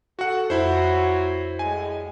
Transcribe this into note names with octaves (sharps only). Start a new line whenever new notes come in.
F#4 A4 F#5
F2 F#3 E4 F#4 C5
A2 G3 G#3 G#5